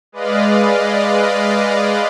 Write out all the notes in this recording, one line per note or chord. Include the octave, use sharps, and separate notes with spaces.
G#3 B4 D5 D#5 F5